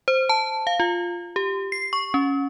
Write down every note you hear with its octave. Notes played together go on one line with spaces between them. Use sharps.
C5
A5
F5
F4
G4
C7
C#6
C#4